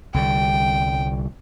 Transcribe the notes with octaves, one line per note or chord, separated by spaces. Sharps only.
C2 D3 G3 G5